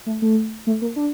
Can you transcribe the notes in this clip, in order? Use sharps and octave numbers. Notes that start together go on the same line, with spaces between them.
A3
A3
A3
A#3
D4